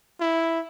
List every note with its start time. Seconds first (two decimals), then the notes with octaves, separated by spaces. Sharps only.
0.21 E4